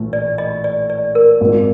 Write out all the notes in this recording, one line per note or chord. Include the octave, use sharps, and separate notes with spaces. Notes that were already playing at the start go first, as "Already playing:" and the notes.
Already playing: A#1 A2 E3 A3
D5
D#5
D5
D5
A#4
G#1 G#2 F3